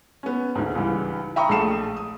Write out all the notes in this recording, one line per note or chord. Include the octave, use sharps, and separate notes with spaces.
B3 C#4
D2 G#2
C#2 G#2 E3 G3
E5 G5 A#5 B5 C#6 D#6
A#1 G#3 A3 A5 C7 E7
D#6